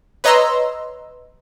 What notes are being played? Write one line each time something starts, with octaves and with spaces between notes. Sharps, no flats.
B4 C#5 D#5 A#5 C6 E6